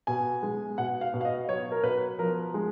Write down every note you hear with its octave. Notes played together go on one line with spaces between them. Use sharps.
B2 G#5
G#3
B2 F#5
F5
B2
F5
D#5
F#3 C#5
A#4
B2 B4
F3 A#4
G#3